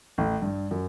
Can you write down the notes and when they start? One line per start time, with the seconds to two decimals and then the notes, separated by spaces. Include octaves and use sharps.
0.18 A1
0.42 G2
0.71 F#2